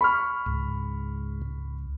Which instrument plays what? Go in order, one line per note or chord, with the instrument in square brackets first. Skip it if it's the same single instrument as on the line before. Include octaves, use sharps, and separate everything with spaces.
[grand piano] B5 C#6 F6
[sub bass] C#2 [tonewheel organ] G#2